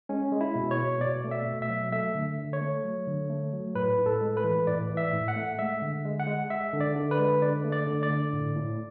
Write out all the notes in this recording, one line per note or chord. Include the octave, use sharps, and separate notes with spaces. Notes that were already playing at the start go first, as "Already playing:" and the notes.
G#3 C#4
G#3
E4
B2
C#5
B2
B2 D5
A3
E5
B2
E5
F#3
A3 E5
D3
D3
C#5
A3
F#3
D3
A3
F#3
A2 B4
A2
A4
G#3
B4
E3
A2 D5
E3
E5
A2
F#5
A3
G#3 E5
D3
G#3
F#5
G#3
G#3 E5
D3
D5
D3
B4
G#3
D3 D5
A3
D5
D3
D5
D3
A2
A2